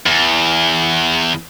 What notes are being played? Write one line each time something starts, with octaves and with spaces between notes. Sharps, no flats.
E2